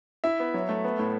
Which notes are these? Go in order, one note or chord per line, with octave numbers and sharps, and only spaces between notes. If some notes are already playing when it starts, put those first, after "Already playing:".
E4 E5
B3
F#3
A3
B3
A2